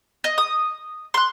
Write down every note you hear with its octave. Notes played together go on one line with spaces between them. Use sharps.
D#5
D#6
C6 F#6